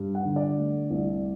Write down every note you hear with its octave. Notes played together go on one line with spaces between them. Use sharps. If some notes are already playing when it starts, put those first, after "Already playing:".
Already playing: G2 G3
F#5
D3
D5
A3
C2